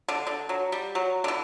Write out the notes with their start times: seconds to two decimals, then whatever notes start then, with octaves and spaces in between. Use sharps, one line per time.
0.08 D3
0.27 D3
0.49 F#3
0.72 G3
0.95 F#3
1.24 D3
1.28 E3